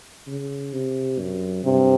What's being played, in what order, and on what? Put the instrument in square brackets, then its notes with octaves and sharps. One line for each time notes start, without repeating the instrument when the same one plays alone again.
[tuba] C#3
C3
F#2
[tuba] G2 [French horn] C3